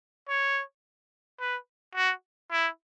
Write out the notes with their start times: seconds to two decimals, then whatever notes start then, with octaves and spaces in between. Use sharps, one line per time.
0.29 C#5
1.40 B4
1.95 F#4
2.51 E4